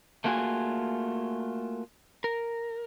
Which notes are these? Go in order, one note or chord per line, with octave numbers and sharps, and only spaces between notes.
A3 A#3 F4 F#4 G#4 G#5
A#4